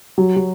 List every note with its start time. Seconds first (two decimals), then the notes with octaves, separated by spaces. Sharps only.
0.18 F#3
0.36 F#3